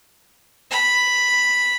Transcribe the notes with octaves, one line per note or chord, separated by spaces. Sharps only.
B5